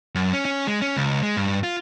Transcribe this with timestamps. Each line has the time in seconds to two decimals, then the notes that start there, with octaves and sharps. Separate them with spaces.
0.15 F#2
0.33 C#4
0.45 C#4
0.67 G#3
0.82 C#4
0.97 C#2
1.23 G#3
1.37 G2
1.64 F4